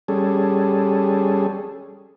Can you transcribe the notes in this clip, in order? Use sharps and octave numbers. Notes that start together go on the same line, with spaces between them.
G3 C#4 G#4 A4